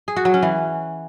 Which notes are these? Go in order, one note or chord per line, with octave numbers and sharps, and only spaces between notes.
G#4
F#4
F#3
C#4
E3